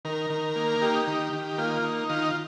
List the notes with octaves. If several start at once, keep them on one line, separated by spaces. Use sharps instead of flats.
D#3 A#4
D#3
A#3
D#4 G4
D#3
D#3
A#3 F4
D#4
D#3 F4